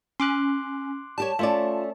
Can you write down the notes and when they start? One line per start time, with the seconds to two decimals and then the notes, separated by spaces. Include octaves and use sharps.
0.20 C#4 C6 D6 F#6
1.18 G3 G4 C#5 A5
1.39 A3 C#4 F4 D5